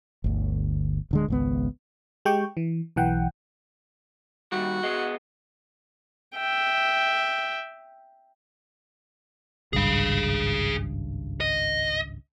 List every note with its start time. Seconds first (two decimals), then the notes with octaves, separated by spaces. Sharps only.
0.24 G1 D2
1.11 D1 D3 G#3
1.28 G#1 C#2 B3
2.25 G#3 G4 G5 C#6
2.57 E3
2.96 B1 E3 F#5 G5
4.52 D#3 G3 F#4
4.83 B3 G#4 D#5
6.36 E5 G5
9.73 G#1 C#2 G2 G#4 F5
11.41 D#5